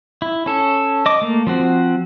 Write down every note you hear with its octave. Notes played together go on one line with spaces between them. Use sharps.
E4
C#4 A4
D#5 D6
A3 A#3
F3 C4 F#4